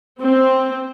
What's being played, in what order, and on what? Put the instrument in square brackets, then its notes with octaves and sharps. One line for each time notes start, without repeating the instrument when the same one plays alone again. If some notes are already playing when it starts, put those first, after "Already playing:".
[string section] C4